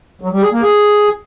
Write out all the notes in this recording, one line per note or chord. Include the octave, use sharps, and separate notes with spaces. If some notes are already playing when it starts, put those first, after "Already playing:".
F#3
G3
G#4
A#3
G#4